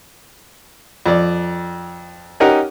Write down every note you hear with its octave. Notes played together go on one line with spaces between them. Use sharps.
F2 D5
C#4 D#4 G4 A#4 F#5